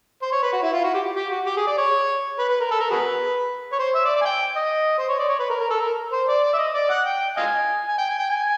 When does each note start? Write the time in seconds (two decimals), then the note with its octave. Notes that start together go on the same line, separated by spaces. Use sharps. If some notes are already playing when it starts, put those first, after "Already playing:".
0.22 C5
0.32 C#5
0.43 B4
0.53 F#4
0.63 E4
0.73 F4
0.84 F#4
0.94 G4
1.15 G4
1.30 F#4
1.46 G4
1.57 G#4
1.67 D5
1.77 C#5
2.39 B4
2.49 B4
2.61 A#4
2.71 A4
2.80 A#4
2.90 F#4 G#4 B4
3.72 C#5
3.79 C5
3.95 E5
4.05 D5
4.16 D5
4.21 G#5
4.25 G5
4.56 D#5
4.98 C5
5.09 C#5
5.19 D5
5.29 C#5
5.39 B4
5.50 A#4
5.60 A#4
5.70 A4
5.81 A#4
6.12 C5
6.28 D5
6.43 D5
6.54 E5
6.58 D#5
6.74 D5
6.90 F#5
7.06 G5
7.37 D#5 F5 G#5
7.88 G#5
7.98 G5
8.09 G#5
8.19 G5
8.30 G#5